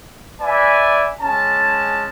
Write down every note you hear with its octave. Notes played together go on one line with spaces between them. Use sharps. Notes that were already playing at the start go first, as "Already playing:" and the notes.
B4 D5 E5 G#5
G#3 C#4 A5